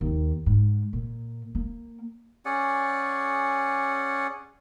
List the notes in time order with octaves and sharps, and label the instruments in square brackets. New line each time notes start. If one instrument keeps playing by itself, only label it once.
[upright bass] D#2
G#2
A#2
A#3
[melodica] C#4 G#4 D5 F#5